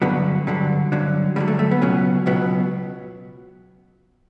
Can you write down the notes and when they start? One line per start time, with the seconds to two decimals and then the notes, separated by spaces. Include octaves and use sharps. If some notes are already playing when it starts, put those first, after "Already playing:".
0.02 G2 D3 F#3 B3
0.47 G2 D3 F#3 G3
0.92 G2 D3 F#3
1.36 G2 D3 F#3 G3
1.48 A3
1.59 A3
1.71 B3
1.81 C#2 B2 F#3 C#4
2.26 C#2 B2 F#3 B3